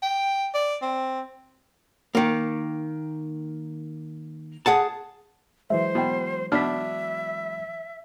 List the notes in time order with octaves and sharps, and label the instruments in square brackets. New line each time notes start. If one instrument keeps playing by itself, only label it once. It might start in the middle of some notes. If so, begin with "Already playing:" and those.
[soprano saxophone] G5
D5
C4
[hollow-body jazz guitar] D#3 A#3
G#4 F#5 A5
[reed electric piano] E3 F#3 G#3 [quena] C5 [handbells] E5
[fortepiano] B2 [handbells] E4 G5
[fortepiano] B2 D4 [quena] E5 [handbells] F6 B6